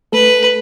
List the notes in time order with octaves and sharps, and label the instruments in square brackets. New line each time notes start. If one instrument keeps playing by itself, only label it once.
[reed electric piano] A3 A4 [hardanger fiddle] B4